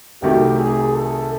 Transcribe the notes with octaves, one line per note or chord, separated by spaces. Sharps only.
C2 C3 D#3 F#3 A3 G4
G#4
A4